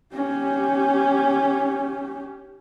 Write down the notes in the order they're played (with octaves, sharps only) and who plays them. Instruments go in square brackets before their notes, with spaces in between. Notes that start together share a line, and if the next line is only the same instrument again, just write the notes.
[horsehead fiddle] C#4 G4